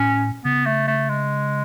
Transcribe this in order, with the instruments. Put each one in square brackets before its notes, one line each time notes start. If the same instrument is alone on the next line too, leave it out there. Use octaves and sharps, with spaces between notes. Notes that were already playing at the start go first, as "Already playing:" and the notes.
Already playing: [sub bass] A2 [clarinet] C#4
[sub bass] C#3 [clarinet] B3
[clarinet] A3
A3
G#3